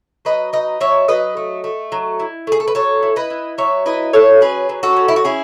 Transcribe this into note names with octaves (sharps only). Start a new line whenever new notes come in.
F#3 B4 D#5
D#4 B4 D#5
F#3 C#5 E5
F#3 B4 D#5
A3
A3
F#3
E4
A3 G#4
A4
B4
F#3 A4 C#5
E4
B4 D#5
E4
F#3 C#5 E5
E4 B4 D#5
F#3 A4 C#5
C#4 G#4 B4
F#3
F#4 A4
C#4
E4
F#4
C#4 E4 G#4